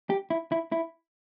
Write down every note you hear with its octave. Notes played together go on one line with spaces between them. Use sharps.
G4
E4
E4
E4